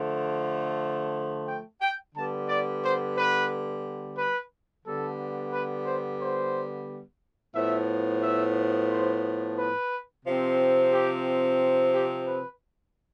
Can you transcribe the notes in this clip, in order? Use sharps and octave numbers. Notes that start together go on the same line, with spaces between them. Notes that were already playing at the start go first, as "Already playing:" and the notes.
Already playing: D3 F3 A3
G5
G5
D3 G3 B3 A5
D5
C5
B4
B4
D3 G3 B3 A4
B4
C5
C5
A2 F3 B3 E5
E5
C5
B4
C3 F3 C4
G4
G4
B4